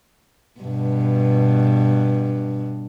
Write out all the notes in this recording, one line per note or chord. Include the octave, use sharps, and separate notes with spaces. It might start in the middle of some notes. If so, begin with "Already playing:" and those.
G2 B2